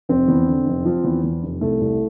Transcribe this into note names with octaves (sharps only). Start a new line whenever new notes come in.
F1 C4
E2
D3
F1
F3
E2
E2
F1
C2 A3
C2